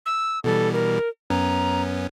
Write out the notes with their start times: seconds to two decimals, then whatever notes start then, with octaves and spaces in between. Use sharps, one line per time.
0.06 E6
0.44 B2 E3 G3 A4
0.73 A#4
1.30 F#2 B3 C#4 A#5